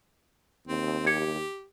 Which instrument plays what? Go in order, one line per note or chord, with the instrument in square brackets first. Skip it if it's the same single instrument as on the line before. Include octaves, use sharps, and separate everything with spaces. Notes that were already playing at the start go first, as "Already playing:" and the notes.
[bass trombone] D#2 [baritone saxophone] C4
[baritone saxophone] G4 [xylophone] G#6 C#7